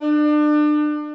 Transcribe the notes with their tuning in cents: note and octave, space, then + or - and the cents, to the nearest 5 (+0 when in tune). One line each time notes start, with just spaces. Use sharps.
D4 +35